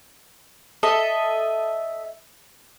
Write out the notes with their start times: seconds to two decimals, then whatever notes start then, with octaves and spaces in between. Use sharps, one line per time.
0.83 A4 D#5 E5